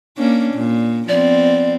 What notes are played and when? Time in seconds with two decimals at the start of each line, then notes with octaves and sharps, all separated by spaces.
0.17 A#3 C#4 D4
0.54 A#2
1.08 F3 B3 C4 D5